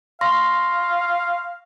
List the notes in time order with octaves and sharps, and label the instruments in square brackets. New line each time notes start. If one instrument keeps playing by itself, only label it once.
[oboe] F5 [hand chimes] C6 C#6 A#6